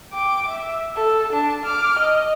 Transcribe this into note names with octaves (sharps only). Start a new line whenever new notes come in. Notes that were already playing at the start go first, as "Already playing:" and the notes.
G5 D6
E5
A4
D4 A5
D6 F6
D#5